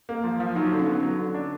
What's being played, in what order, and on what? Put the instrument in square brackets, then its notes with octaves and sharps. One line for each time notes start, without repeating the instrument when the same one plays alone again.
[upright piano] A#3
F3
F3
[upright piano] F#3 [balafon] D#4
[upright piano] D3
[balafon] C#4
[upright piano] B3
F#3
D3
D4